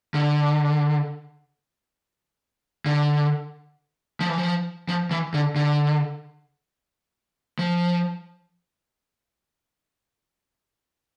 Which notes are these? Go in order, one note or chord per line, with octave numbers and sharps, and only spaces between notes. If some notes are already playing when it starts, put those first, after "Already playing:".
D3
D3
F3
E3
F3
F3
E3
D3
D3
F3